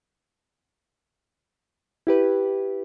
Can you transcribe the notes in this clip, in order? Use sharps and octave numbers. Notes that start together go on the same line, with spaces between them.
E4 G4 B4